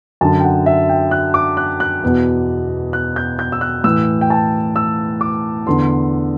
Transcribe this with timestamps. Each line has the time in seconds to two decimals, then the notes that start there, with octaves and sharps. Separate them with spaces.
0.21 F#2 D3 A5
0.40 G5
0.43 F#5
0.66 E5
0.89 G5
1.11 F#6
1.34 D6
1.57 F#6
1.80 F#6
2.03 E2 B2
2.93 F#6
3.16 G6
3.39 G6
3.52 E6
3.61 F#6
3.84 A2 E3 E6
4.21 G5
4.30 A5
4.76 E6
5.21 D6
5.66 E2 D3 C6